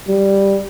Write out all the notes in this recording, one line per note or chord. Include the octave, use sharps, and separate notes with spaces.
G3